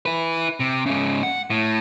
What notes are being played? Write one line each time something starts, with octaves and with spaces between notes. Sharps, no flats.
E4 B4
C3
G#2 C#3
F#5
A2